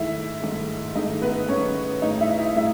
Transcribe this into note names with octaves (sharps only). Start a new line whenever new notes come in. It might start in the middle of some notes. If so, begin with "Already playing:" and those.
Already playing: G#2 D#3 A3 E4 E5
G#2 D#3 A3
G#2 D#3 A3 D#4 D#5
B3 B4
G#2 D#3 A3 C#4 C#5
A2 G#3 D#4 D#5
E4 E5
E4 E5
A2 G#3 E4 E5